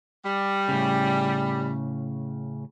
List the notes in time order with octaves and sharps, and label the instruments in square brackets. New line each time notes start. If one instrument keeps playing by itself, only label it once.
[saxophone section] G3
[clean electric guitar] A2 C#3